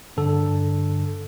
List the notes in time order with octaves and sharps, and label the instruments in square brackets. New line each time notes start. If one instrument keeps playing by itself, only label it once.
[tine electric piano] G2 D3 A4